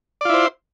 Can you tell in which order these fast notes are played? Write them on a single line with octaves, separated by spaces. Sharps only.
D5 F4 E4 C5